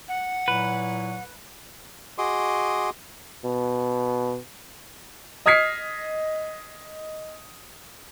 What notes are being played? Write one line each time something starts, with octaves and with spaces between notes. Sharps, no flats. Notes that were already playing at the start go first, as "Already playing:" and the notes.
F#5
A#2 F#3 E4 B4
F#4 G#4 D#5 C6 D6 D#6
B2
D#5 D#6 F6 G#6 B6 C7